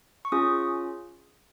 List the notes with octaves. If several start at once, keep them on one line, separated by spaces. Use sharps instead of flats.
C#6
C#4 F4 G#4 D#6